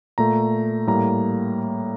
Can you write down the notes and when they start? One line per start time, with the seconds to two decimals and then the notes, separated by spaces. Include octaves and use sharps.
0.18 A#2 A3 A#5
0.87 A2 G3 A#3 A#5